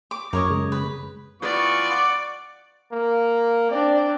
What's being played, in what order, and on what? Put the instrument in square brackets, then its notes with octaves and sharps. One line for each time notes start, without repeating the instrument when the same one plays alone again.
[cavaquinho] D6
[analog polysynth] F#2 [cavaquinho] A#4 C#5 D#5
[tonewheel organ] C#3 G#3
[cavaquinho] B4
[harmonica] E3 B3 F4 [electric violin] D5 [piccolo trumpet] C#6
[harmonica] F#5 D6
[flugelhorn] A#3
[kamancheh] C4 D4 [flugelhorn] D5